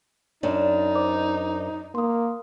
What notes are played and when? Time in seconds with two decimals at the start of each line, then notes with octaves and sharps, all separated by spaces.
0.43 F#2 D4 D#4
0.95 C5 D5 D6
1.95 A#3 C6 D#6